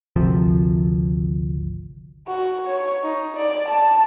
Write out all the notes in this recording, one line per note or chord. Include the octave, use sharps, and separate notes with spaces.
G#1 D2 C3 F3
F#4
C#5
D#4
D5
A5